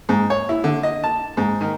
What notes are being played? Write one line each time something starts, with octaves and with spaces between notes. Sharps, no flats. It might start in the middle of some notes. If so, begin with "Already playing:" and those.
G#2
C#5
E4
D3
D#5
A5
G#2
D#3